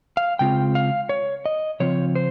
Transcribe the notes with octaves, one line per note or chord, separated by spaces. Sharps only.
F5
C#3 G#3 C4 F4 G5
F5
C#5
D#5
C#3 F3 C4 F4 C#5
C5